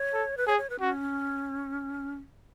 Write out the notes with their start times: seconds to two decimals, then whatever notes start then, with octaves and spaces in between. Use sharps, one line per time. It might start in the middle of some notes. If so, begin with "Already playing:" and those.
Already playing: C#5
0.14 A4
0.37 B4
0.47 G#4 C#5
0.58 C#5
0.70 B4
0.80 C#4 F#4